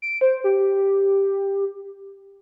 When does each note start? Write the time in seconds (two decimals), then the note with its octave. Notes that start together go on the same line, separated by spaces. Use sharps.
0.02 D7
0.21 C5
0.44 G4